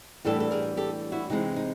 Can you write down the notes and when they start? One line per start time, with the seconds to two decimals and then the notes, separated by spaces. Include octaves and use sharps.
0.25 A2 E3 G3 B3 D4 G4 A4
0.40 A4
0.51 G#4 A#4
0.77 G4 A4
1.12 E4 F#4
1.30 C3 E3 G#3 C4 D#4
1.56 D#4